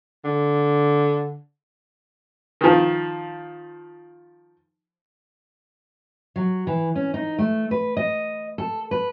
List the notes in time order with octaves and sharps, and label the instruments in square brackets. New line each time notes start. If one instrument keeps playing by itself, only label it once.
[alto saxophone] D3
[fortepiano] D#3 F3
[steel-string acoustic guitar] F#3
E3
C#4
D#4
A3
B4
D#5
A4
B4